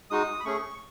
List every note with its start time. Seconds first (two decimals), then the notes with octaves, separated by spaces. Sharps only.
0.10 G#3 D#4 F#4 D#6
0.40 B5
0.45 A3 C#4 G#4 C#6